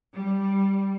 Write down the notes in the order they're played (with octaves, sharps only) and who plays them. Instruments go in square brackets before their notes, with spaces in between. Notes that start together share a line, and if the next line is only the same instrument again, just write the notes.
[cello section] G3